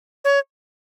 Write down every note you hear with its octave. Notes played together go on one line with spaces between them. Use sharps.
C#5